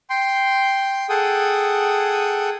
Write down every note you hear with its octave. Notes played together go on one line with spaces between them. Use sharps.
G5 C6
G#4 A4 F#5 G5 D#6